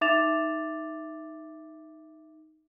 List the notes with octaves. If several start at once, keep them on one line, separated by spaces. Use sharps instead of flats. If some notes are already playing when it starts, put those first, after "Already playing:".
D#4 E5 D6 A6 E7 F7